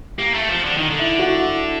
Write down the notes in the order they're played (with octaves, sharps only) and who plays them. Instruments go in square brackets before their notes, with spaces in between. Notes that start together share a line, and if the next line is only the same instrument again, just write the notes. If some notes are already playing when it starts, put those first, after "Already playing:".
[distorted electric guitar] A#3 [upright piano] G4
[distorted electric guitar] A3
F3
D3
[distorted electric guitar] D#3 [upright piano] D#4
[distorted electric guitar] D3
[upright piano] E4
F#4
E4